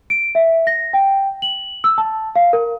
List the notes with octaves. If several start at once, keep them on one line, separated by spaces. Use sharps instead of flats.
D7
E5
A#6
G5
F#7
E6
A5
F5
A#4